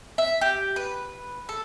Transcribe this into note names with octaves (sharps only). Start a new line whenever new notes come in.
E5
G4
B4
A4